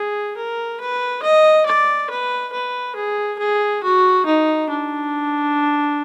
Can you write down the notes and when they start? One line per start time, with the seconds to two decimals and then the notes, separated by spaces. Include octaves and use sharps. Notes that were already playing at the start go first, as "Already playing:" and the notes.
Already playing: G#4
0.37 A#4
0.80 B4
1.22 D#5
1.66 D5
2.10 B4
2.52 B4
2.96 G#4
3.39 G#4
3.83 F#4
4.26 D#4
4.69 D4